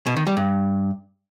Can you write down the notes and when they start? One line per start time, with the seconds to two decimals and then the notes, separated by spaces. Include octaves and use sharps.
0.06 B2
0.17 D#3
0.27 G3
0.37 G2